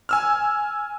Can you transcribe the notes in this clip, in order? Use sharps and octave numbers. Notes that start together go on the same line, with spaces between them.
G#5 E6 F6